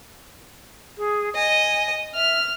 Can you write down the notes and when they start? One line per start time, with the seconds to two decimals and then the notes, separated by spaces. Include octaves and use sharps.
0.98 G#4
1.35 D#5 G#5
2.15 E5 F6